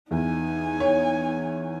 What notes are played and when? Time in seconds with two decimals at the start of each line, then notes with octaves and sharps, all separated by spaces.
0.11 E2 D#4 G#5
0.80 C#5